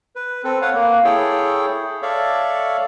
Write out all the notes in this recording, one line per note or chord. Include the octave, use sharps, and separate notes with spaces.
B4
C4 A4
B4 C#5 F5 F#5
A#3
E4 G#4 A4 C#5 G5
A4 C#5 D5 E5 F5